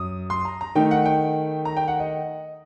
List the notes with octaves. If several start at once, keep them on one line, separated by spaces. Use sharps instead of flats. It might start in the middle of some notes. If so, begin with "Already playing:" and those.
Already playing: F#2 D#6
C6
A#5
A#5
D#3 A3 D#4 G5
F#5
G5
A#5
G5
F#5
D#5